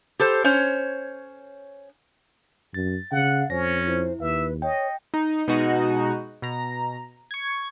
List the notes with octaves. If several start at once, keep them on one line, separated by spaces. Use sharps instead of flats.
G4 A4 C5
C#4 C5 C#5
F#2 A6
C#3 F5 F#5
F2 C#4 C5 A#6
E4 C5
D#2 B4 E5
C#5 D#5 G5
D#4
B2 G#3 D#4 F#4
B2 A#5
C#6 G#6